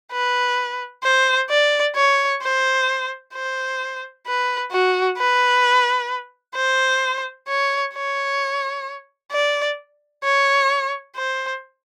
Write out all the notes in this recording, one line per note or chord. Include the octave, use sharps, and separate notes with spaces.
B4
C5
D5
C#5
C5
C5
B4
F#4
B4
C5
C#5
C#5
D5
C#5
C5